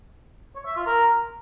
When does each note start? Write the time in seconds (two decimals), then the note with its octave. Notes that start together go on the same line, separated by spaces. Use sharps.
0.56 C#5
0.66 E5
0.76 F4
0.86 A#4